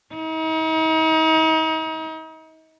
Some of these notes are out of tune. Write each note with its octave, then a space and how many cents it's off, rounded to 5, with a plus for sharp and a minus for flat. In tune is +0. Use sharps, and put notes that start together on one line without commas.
D#4 +40